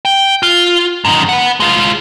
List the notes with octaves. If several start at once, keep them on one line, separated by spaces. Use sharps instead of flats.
G5
F4
F#2 D#3
B4 F#5
G#3 F4